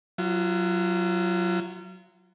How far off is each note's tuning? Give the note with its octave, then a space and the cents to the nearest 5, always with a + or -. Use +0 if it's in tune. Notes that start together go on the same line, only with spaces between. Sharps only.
F#3 +0 F4 -35